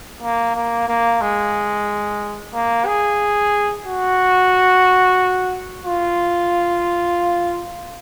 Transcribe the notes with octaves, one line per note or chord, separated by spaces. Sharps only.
A#3
A#3
A#3
G#3
A#3
G#4
F#4
F4